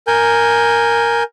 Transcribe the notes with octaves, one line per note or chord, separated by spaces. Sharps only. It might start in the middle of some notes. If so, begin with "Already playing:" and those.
A#4 G#5 G6